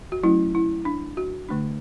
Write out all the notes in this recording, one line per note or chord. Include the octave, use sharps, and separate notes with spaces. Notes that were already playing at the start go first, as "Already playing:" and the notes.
F#4
F#3 A3 C#4 E4
E4
D4
F#4
D3 A3 D4